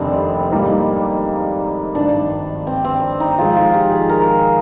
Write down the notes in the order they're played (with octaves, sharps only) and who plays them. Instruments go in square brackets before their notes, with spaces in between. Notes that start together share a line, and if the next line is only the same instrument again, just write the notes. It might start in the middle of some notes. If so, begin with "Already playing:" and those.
Already playing: [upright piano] F1 D#2 G3 [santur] C4 D4
[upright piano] G#2 G3 A#3 D#4
[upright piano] G#1 G2 D#3 [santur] D4
[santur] C4
C4
D#4
[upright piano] G#1 G#2 F3 G#3 [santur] F4
[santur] F4
G4
G#4
A#4